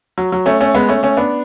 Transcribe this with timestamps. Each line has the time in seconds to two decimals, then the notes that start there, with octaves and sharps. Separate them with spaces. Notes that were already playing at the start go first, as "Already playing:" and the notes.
0.18 F#3
0.32 F#3
0.46 A3 C#4
0.61 A3 C#4
0.74 G#3 B3
0.89 A3 C#4
1.03 A3 C#4
1.17 B3 D4